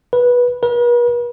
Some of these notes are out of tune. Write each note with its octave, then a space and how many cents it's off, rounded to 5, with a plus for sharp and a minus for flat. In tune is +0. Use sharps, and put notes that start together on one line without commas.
B4 -15
B4 -45